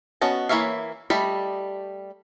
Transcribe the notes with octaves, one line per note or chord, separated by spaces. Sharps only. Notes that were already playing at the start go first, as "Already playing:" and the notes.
B3 C#4 F#4 D#5 A5
E3 A#3 C#5 E5 F5
G3 A3 D5 D#5 B5